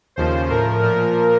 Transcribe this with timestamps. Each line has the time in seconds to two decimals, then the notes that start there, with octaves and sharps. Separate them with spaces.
0.16 D#2 C#3 F3 C5
0.48 A2 F3 A#4
0.81 A#2 F3 A#4